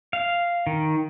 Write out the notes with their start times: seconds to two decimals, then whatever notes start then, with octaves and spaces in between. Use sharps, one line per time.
0.13 F5
0.67 D#3